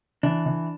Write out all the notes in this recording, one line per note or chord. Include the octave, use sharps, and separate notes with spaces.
E3 D4
E3